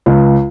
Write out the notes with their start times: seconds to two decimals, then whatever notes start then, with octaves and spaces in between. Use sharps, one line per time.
0.06 C#2